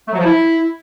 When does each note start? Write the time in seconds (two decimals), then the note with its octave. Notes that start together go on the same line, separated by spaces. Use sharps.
0.07 A3
0.13 F#3
0.19 F3
0.25 E4